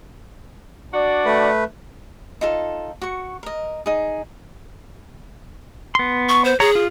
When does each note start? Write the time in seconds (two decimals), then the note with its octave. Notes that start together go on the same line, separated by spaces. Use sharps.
0.94 D4 F#4 D5
1.25 A3 B4
2.41 D#4 F4 A4
3.02 F#4 C#6
3.43 A#4 D#5
3.86 D#4 G#4
5.95 B3 C6
6.29 C#6
6.45 C5
6.60 G#4 C#5 A#5
6.75 F4